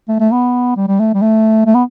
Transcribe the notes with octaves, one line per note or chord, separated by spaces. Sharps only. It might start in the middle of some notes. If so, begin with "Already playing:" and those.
A3
A3
B3
G3
G3
A3
G3
A3
A3
B3